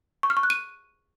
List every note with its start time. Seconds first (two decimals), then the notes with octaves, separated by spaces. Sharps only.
0.23 C#6
0.30 F6
0.37 C#6
0.43 F#6
0.50 D#7